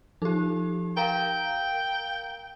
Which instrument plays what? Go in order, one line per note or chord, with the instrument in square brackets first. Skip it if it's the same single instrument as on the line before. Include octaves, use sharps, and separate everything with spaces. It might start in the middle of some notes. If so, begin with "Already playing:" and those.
[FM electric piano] F3 A4 [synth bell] D#4 G4
[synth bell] A#4 F5 [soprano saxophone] G5 [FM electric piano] A#5